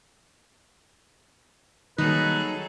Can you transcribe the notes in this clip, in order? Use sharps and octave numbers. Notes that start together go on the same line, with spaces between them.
D#3 F#3 G3 A#3 D#4 G#4 A4 B4